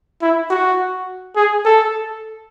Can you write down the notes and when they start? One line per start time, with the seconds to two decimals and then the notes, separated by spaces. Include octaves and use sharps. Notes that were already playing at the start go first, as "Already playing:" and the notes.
0.22 E4
0.50 F#4
1.36 G#4
1.65 A4